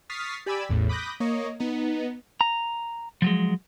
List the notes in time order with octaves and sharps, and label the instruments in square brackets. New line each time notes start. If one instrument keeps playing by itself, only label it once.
[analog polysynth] C#6 D#6 F6 A6 B6 C7
G4 D5 G#5 B5 D6 E6
A1 E2 A2
B5 D6 D#6 F#6 G6 A#6
A#3 C#5 D#5
B3 D#4
[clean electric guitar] A#5
F3 F#3 G#3